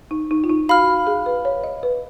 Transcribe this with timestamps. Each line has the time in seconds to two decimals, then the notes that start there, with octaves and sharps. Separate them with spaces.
0.11 D#4
0.31 D#4
0.44 F4
0.50 D#4
0.69 F#4 F5 B5 F6
1.07 G#4
1.26 B4
1.45 C#5
1.64 D#5
1.83 B4